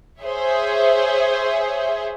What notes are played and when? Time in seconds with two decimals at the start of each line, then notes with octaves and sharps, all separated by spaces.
0.21 G#4 C5 C#5 E5